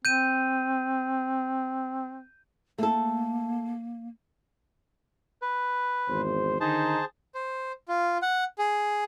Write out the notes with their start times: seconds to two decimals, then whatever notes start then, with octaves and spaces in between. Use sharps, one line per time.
0.05 C4 G6 D#7
2.78 A3 A#3 A4
5.42 B4
6.09 G#1 E2 C5
6.61 D3 D#3 D#4 G#4 C5 A5
7.35 C5
7.88 F4
8.22 F#5
8.58 G#4